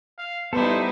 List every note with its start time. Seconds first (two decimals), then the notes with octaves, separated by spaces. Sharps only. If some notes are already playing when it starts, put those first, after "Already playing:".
0.18 F5
0.53 G3 B3 D#4 E4 A4 B4 C5